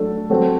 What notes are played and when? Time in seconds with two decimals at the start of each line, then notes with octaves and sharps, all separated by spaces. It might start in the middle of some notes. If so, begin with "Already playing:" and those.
Already playing: F#3 A3 D4 A4
0.30 F#3 A3 C4 F#4